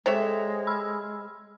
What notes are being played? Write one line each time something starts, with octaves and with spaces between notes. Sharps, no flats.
C3 G#3 A4 C5 C#5 E5
B5 E6 F6